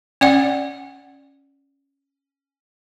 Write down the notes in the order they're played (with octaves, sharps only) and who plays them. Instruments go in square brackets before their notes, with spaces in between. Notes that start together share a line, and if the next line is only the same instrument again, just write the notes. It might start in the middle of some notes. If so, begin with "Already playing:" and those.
[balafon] C#4 D5 F#5